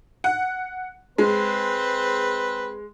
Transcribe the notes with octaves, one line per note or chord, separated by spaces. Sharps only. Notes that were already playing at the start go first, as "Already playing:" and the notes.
F#5
G#3 C4 B4 C5